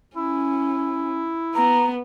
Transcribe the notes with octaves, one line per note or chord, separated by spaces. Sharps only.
C#4 E4
B3 A#5